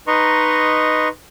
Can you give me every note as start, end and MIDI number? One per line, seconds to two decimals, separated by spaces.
0.07 1.08 63
0.07 1.08 71
0.07 1.08 75
0.07 1.08 82
0.07 1.08 84
0.07 1.08 85